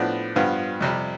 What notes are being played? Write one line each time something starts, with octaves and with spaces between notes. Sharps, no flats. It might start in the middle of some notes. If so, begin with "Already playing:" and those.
Already playing: A2 F3 B3 D4
G2 F3 B3 F4
F2 C3 G3